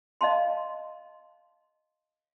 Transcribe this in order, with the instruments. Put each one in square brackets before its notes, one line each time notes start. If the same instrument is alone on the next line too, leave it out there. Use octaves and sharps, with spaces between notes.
[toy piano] D#5 F5 A5 C6